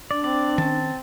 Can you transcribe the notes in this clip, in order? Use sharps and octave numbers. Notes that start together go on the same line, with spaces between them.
D4 D5
C4 D5
D#3 C#4 A5